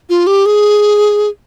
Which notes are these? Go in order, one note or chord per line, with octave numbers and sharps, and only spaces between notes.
F4
G4
G#4